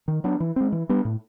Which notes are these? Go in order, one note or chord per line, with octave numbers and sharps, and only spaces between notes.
D#3
F#3 B3 D4
E3
G#3 C4
E3
G3 B3 D4
A2